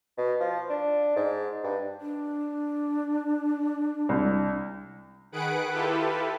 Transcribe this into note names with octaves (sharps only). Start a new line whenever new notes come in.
B2
F3
D4
G#2
G2
D4
C2
D#3 G#4 B4 F#5 F#6 D7
E4 F4 G4 A4 B4